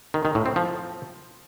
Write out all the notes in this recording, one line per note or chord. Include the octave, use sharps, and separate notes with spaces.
D#3
D#3
A2
C4
F3